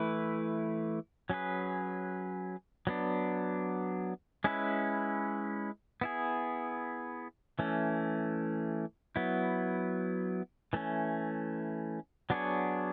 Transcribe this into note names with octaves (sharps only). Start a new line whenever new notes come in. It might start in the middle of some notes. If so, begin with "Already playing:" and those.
Already playing: E3 A3 E4 B4
F#3 C#4 G#4 B4
F#3 B3 D4
G#3 C#4 E4 B4
B3 E4 G#4
E3 A3 C#4
F#3 B3 E4
E3 A3 C#4
F#3 B3 D4 G#4 C#5